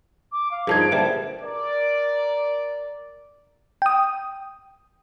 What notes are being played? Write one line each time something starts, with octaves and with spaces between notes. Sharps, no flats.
D6
F5
G2 F3 D#4 G#4 A#4 A5 G#6
D7
A#2 D3 G3 B4 C5 E5 A5
A#4 D5
G5 D#6